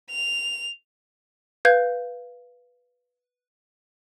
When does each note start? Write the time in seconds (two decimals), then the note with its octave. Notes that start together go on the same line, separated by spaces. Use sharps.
0.10 F7
1.65 B4 F5 G6 G#6